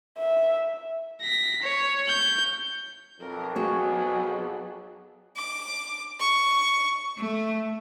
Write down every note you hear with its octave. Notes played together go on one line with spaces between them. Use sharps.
E5
A#6 B6
C#5
G6
B1 F2 A#4
F#3 B3 F#4 G#4 C#5
D6
C#6
A3